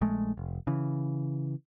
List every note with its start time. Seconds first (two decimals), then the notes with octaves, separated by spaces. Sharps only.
0.01 A#1 G#3 A3
0.37 F1
0.67 C#3 E3